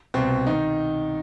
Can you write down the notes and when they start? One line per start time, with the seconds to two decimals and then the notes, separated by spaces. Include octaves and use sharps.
0.14 C2 B2 C4
0.47 D#3 D#4